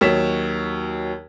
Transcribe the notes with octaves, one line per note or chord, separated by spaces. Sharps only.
D#2 F#3 C#5 B6 E7